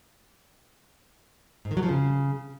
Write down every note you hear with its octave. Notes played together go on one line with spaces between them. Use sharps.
G#2
D#3
F#3
F3
C#3